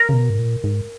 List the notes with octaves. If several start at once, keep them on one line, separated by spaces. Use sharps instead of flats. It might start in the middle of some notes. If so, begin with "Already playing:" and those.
Already playing: A#4
C#3
B2
G#2
A#2
G#2